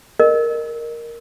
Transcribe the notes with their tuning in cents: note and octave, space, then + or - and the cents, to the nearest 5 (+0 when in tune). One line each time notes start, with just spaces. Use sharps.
A#4 +0 D#5 -30